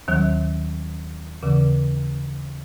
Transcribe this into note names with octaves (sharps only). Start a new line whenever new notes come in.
D#2 D#3 F#3
D#2 C#3 E3